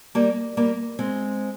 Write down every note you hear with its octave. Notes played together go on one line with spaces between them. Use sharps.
G3 A#3
G3 A#3
G#3 C4